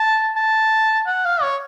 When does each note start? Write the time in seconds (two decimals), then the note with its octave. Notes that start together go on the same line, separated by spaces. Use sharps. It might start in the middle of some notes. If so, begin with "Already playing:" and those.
Already playing: A5
0.36 A5
1.06 F#5
1.25 F5
1.42 C#5